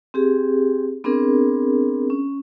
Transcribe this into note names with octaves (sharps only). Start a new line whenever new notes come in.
C4 G4 G#4
B3 C4 D4 G#4 A#4
C#4